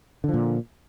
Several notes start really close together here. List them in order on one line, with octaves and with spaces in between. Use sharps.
D3 F3 A#2